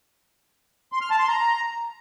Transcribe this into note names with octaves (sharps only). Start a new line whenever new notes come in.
C6
F6
A5
C6
A#5